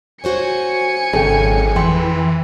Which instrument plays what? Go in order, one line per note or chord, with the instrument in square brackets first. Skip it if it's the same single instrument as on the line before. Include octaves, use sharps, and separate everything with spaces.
[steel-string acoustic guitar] F#4 C5 C#5 [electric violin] G#5 C#7
[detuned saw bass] G#1 [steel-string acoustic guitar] C#3 F#3 [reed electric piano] G#4 A4 G5
[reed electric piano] F2 G5 C6 [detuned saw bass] E3 [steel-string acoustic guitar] B4